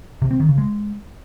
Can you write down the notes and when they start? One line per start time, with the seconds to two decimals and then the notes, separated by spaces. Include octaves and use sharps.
0.22 C3
0.31 C4
0.40 D#3
0.49 C#3
0.58 G#3